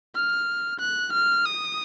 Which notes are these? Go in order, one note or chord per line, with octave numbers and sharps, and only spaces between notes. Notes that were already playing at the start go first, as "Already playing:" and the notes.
F6
F#6
F6
D#6